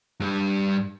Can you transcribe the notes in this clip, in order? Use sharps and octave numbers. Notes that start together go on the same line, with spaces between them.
G2 G3